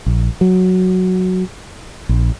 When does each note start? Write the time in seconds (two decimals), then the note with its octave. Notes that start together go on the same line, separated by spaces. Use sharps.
0.06 A#1
0.41 F#3
2.09 A#1